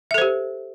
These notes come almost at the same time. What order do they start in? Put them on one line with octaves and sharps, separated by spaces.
E5 A4 C5 G4